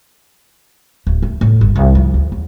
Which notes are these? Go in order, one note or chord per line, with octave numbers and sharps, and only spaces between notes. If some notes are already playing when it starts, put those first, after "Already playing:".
D1
A3
A2
G1
C2
F3
D2
E2